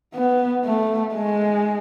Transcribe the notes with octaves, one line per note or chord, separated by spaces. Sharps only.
B3
A3
G#3